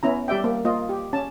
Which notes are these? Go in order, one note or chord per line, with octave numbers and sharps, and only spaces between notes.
B3 C#4 E4 A#5
G3 G4 D5 E5 G5
A#3
A#3 F4 D#5
G4
C#4 A5